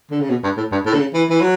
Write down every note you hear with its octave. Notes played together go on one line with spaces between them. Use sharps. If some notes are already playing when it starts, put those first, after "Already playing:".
D3
C#3
B2
G2
A2
G2
A2
D3
C#3
E3
E3
F#3